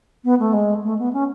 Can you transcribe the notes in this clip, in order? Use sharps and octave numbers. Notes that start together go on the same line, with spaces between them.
B3
A3
G#3
A3
B3
C#4